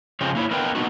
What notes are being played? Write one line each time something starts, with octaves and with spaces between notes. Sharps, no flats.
C#3 F3 G#3 C4 C#5
A#3 E4 C#5
B3 A#4 B4 D#5 F5 G5
A#3 B3 D#4 F#4